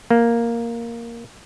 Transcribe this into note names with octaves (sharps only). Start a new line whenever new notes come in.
A#3